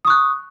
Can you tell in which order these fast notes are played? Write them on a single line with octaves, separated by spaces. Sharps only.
D#6 C#6 F#6